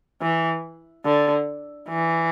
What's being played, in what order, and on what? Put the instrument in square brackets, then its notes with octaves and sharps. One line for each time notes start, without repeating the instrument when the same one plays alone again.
[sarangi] E3
D3
E3